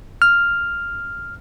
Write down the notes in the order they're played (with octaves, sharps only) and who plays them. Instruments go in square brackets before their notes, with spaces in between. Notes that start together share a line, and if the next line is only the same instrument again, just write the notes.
[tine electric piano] F6